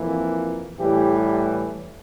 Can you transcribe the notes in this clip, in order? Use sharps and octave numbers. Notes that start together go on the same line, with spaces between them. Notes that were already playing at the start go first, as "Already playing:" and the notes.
Already playing: F2 E3 A#3
A2 E3 G3 G4